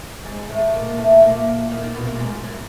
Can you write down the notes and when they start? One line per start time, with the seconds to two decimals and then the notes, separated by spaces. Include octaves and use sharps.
0.25 G#2 G#3
0.49 A2 A3
0.74 A#2 A#3
0.98 A2 A3
1.22 A#2 A#3
1.71 D#3 D#4
1.83 A#2 A#3
1.95 B2 B3
2.07 A#2 A#3
2.20 G#2 G#3
2.43 F#2 F#3